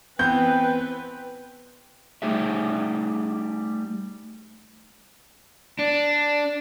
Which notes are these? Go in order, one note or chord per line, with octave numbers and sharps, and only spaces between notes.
E3 B3 C4 B4 G5 G6
G3 A3 D#4 G4 G#4 E5
D4